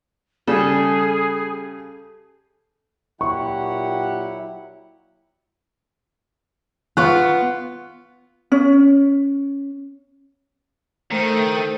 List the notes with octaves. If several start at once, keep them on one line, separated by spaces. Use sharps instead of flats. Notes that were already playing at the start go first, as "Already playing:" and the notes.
C#3 G3 G#4 A4
A#2 F#3 E4 G4 F#5 C#6
B3 F4 C#6 F#6
C#4
D#3 A3 C5 D#7